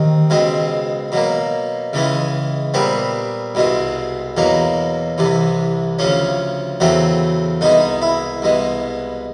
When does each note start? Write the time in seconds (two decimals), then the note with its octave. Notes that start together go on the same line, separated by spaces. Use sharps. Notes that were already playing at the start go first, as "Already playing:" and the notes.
Already playing: D#2 D#3 C4
0.30 C#2 B2 G#3 C4
1.12 B2 F#3 A#3
1.93 C#2 C#3 E3 G#3
2.74 A#2 G3 B3 C4
3.55 C2 B2 G#3 C4
4.37 E2 B2 F#3 A#3
5.18 C2 C3 E3
5.99 D2 C#3 F3 C#4
6.80 E2 C#3 F#3 A3 C4
7.61 C2 B2 G#3 D#4
8.02 E4
8.42 C2 B2 G#3